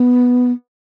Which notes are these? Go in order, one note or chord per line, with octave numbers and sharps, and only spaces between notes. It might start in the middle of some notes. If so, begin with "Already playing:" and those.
Already playing: B3